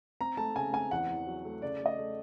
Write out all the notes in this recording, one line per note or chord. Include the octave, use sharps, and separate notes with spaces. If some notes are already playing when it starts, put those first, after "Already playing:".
C4 A#5
A3 A5
C#3 G#5
C4 G#5
E2 F#5
E2
F#3
A3
C#3 D5
A3
D#5
A3